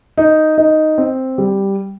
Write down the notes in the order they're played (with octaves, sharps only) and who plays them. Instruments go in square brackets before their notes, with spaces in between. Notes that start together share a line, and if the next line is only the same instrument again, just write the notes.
[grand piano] D#4
D#4
C4
G3